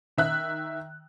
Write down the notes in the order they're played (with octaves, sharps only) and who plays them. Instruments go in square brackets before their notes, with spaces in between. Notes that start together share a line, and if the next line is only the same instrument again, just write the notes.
[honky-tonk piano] D#3 E5 F#6